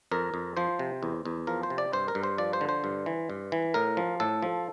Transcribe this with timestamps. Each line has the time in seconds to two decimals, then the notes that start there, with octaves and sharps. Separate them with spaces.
0.11 F2 A#4
0.34 F2
0.57 F3 C5
0.79 C3
1.03 E2
1.25 E2
1.47 F3 A#4
1.63 C5
1.70 C3
1.78 D5
1.93 G2 C5
2.08 A#4
2.15 G2
2.23 C5
2.38 F3 D5
2.53 C5
2.61 D3
2.69 C5
2.84 G2
3.06 E3
3.30 G2
3.52 E3
3.74 A2 A#4
3.97 F3
4.20 A2 A4
4.43 F3